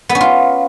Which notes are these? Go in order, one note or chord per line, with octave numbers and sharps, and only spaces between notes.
B3
C#4
F4